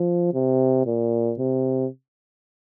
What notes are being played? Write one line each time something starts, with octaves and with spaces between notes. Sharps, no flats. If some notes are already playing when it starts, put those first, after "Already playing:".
Already playing: F3
C3
A#2
C3